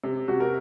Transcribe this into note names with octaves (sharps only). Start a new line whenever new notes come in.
C3
C3 F#4
A#4